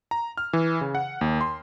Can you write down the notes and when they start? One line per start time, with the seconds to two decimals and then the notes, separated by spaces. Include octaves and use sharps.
0.11 A#5
0.37 F6
0.53 E3
0.81 C#3
0.95 F#5
1.21 D#2
1.41 C6